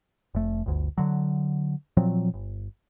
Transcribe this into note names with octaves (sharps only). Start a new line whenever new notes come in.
F1 A3
G1 D2
D3 F#3
A#2 F3 F#3 C4
G1